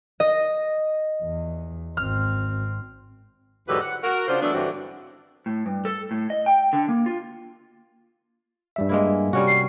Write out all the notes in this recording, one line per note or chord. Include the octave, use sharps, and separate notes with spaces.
D#5
E2
G#1 C4 F6
E2 G#2 D3 F#3 G4 B4
F#5
F#4 A#4
C#3 D4 F4 F#4 C5
E3 F#3 A3 B3 D4
G2 D3 E3 F#3 C4 F#4
A2
G2
A4
A2
D#5
G5
D3
A#3
F4
G2 G3 E5
G#3 A#3 E4
C3 G3 C#4 F#4
C7